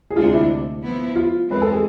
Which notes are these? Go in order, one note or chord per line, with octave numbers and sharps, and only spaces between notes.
G#4
D2 C3 G#3 D4 F4
E4
F3 B3 E4
F4
E3 G#3 C4 B4
A4
G#4